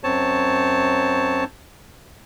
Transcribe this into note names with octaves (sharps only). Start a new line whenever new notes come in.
F#2 C4 C#5 A5